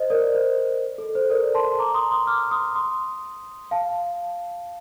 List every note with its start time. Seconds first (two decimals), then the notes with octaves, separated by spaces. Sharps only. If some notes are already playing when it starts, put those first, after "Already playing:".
Already playing: C5 D#5
0.10 A#4 D5
0.35 C5
0.98 A4
1.15 C5
1.30 A#4 D5
1.54 A5 C6
1.79 A#5 D6
1.94 C6 D#6
2.11 C6 D#6
2.27 D6 F6
2.51 C6 D#6
2.75 C6 D#6
3.71 F5 A5